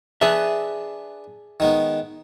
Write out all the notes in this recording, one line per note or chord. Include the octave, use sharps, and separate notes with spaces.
D4 G#4 B4 E5
D#3 G#3 B3